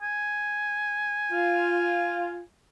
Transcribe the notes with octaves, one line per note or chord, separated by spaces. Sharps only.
G#5
F4